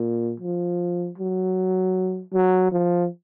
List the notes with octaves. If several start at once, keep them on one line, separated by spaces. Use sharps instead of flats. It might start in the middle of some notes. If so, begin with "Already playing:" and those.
Already playing: A#2
F3
F#3
F#3
F3